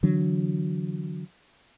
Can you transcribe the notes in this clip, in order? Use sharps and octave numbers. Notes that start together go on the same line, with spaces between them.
D3 E3 F#3 D4